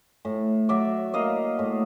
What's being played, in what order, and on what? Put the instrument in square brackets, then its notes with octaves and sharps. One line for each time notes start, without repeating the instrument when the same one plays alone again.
[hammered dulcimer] A2
F#3 D5 E5
A#3 D#5 F5
A2